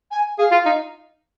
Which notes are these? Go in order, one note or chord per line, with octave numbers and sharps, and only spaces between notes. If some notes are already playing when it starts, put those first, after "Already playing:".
G#5
G#4 F5
F4
D#4